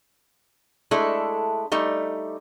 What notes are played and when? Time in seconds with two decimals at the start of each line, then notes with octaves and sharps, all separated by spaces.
0.91 G#3 A3 D4 E4 A4
1.72 G3 A3 D#4